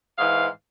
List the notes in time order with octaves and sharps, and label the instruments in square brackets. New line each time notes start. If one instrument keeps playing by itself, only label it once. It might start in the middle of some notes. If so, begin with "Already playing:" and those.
[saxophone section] G#2 E3 F5